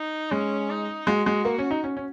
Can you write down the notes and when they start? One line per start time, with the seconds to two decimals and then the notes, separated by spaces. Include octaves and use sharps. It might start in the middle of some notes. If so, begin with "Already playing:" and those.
Already playing: D#4
0.31 G#3 C#4
0.69 D#4
1.07 G#3 F#4
1.26 G#3
1.45 A#3
1.58 C#4
1.71 D#4
1.84 C#4
1.97 C#4